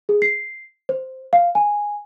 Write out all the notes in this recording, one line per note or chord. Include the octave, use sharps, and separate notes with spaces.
G#4
C7
C5
F5
G#5